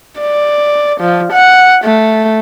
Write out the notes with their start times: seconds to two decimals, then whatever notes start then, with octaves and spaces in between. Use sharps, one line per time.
0.21 D5
1.01 F3
1.33 F#5
1.84 A3